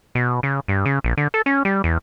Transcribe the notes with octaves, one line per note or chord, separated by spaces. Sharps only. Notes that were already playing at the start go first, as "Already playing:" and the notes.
B2
C#3
G2
C#3
A#1
D3
A4
C#4
G3
E2